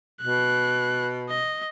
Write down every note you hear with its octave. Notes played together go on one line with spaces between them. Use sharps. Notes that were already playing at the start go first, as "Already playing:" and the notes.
B2 F#6
D#5